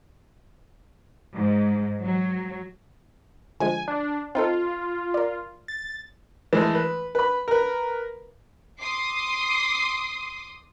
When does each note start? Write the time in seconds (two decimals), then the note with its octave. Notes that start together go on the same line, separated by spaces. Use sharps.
1.34 G#2
2.02 F#3
3.60 D3 F3 G#3 G#5
3.88 D4
4.35 C4 D#4 F4 A4
5.14 A#4 D5
5.68 A6
6.53 E3 G#3 A3
6.75 B4
7.15 B4 B5
7.48 A#4 B4
8.80 C6 D6 D#6 C7